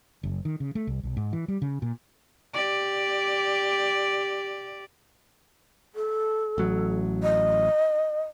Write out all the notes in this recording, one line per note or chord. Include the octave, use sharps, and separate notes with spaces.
F#1
D#3
C#3
A3
C2
B1
G#2
E3
G3
C#3
A#2
G4 D5
A4
A1 F#3
D#5